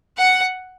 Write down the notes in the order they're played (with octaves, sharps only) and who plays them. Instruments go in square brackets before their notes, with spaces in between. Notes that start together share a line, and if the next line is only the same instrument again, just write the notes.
[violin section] F#5